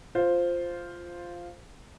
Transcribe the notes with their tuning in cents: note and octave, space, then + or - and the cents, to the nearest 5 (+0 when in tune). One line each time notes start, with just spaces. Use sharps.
F4 +0 C5 +0